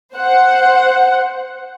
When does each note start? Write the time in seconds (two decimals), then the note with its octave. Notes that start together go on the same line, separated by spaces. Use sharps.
0.14 C5 F#5